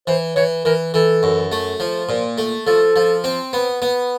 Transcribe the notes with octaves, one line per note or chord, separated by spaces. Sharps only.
E3 C5
E3 C#5
E3 A#4
E3 A4
F#2
A3
F3
A#2
A3
F3 A4
F3
C4
B3
B3